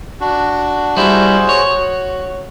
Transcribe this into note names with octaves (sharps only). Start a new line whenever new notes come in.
D4 F#4
G3 E4 F#4 G#4 C5
C#5
F#4